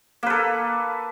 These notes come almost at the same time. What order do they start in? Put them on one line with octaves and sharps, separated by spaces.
A#3 B4 A4